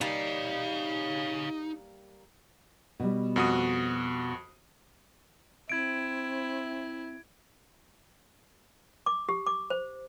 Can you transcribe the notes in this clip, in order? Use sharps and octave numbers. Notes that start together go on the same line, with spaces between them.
G3 A#3 D#4 C#5 F5
B2 G3
F2 F#4 D#6
C4 E4 G#6 D7
D6
G4
D6
C5